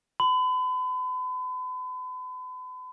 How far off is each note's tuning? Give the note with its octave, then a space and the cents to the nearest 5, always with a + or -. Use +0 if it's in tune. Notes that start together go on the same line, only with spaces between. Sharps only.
B5 +40